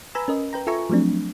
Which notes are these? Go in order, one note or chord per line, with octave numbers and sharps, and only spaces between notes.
B4 G#5 A#5 B5 E6
C#4 A#4 D#5
B4 G5 A#5
F4 A4 E5 G#5 A#5 C#6
F3 F#3 A3 C4 D4